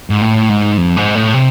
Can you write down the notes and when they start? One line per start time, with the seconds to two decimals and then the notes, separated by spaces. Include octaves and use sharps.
0.10 G#2
0.21 A2
0.49 G#2
0.78 F2
0.97 G#2
1.16 A2
1.34 C3